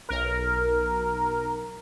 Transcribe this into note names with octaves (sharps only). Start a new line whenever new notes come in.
B1 A#4